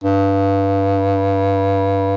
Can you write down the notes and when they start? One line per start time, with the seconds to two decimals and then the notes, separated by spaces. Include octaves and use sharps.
0.04 G2